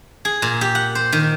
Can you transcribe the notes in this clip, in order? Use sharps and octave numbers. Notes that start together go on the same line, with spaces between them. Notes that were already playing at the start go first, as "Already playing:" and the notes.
G#4
A#2
G4
F#5
C5
D#3